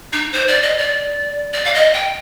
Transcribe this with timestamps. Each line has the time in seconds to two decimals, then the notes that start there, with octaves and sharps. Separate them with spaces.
0.13 D#4
0.33 C5
0.48 D5
0.63 D#5
0.78 D5
1.53 D5
1.65 F5
1.74 D#5
1.94 G5